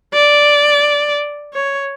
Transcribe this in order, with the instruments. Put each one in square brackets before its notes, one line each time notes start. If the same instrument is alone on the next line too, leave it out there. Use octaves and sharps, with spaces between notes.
[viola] D5
C#5